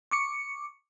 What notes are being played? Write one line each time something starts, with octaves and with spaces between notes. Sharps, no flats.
C#6 D6 C#7